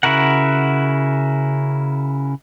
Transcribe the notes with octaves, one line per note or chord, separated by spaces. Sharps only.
C#3 E4 F#4 A#4 F#5